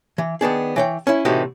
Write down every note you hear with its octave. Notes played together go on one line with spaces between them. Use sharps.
E3
D#3 B3 D4 G#4
E3 C#5 G5
C#4 E4
A2 C3 E3 D#4 F#4 G4